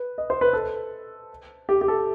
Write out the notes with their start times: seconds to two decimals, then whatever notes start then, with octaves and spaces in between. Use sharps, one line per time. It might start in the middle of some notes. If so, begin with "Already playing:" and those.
Already playing: B4
0.18 D#5
0.30 C5
0.41 B4
0.53 A4
1.69 G4
1.81 G4
1.88 A4